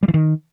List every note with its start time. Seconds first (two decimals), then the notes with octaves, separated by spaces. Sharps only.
0.03 G3
0.08 E3
0.14 D#3